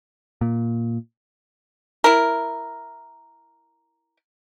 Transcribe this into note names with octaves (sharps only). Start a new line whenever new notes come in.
A#2
E4 A#4